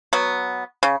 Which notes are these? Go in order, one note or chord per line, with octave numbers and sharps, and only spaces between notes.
F#3 B3
C#3